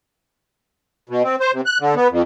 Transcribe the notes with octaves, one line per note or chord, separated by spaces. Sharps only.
B2
C4
C5
C3
F#6
D3
B3
F2